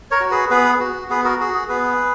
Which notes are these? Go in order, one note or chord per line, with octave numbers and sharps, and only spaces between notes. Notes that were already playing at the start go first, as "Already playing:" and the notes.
A#4 C#5
F#4
G#4 B4
B3 G#4 B4
F#4
B3 G#4 B4
F#4 A#4
F#4 G#4
G#4
B3 G#4 B4